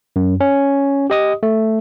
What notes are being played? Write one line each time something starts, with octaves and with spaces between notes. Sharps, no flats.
F#2
C#4
G4 D#5 D#6
A3